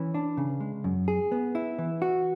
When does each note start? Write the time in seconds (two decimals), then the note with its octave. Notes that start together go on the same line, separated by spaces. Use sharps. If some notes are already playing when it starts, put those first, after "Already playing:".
Already playing: E3 C#4
0.14 D4
0.37 C#3
0.60 G#3
0.84 F#2
1.08 G#4
1.32 B3
1.55 E4
1.79 E3
2.02 F#4